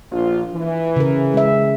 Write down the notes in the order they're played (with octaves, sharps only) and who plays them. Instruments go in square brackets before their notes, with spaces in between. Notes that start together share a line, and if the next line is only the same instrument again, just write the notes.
[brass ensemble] A#1 F4
E3
[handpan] C#3 A#4
G#3 E5